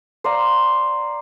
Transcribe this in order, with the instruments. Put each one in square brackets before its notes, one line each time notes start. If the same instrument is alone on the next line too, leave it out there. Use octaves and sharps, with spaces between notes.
[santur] C5 D5 F5 A#5